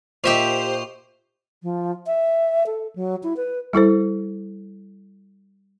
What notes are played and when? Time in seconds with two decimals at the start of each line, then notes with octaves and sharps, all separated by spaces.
0.24 A#2 D#4 G4 C5 E5 F5 C#6 F7
1.63 F3
2.06 E5
2.66 A4
2.96 F#3
3.23 E4
3.36 B4
3.73 G3 E4 A4 C5